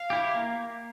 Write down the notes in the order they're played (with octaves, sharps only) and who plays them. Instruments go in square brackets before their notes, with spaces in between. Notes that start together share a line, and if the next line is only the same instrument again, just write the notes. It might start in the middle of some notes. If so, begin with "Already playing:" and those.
Already playing: [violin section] F5
[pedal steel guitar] E4 G4
A#3